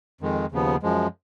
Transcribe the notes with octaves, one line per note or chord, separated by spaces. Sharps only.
F2 D#3 G#3
D#2 C#3 F3 B3
F#2 F3 G#3